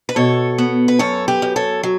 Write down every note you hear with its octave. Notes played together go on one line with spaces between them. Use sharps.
B4
B2 A4 C#5
B3
B4
F#2 A4 C#5
G4 B4
F#2
A4 C#5
F#3